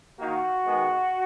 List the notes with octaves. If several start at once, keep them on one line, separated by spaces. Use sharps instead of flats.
D#3 A#3 F#4
D#3 G#3 B3